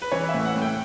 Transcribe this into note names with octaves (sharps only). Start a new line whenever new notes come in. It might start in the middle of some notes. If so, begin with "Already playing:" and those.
B4
E3 C#5
E5
A2
F#5
A2
G5